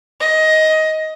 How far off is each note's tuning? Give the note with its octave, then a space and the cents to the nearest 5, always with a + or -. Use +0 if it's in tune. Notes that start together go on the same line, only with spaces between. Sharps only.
D#5 +15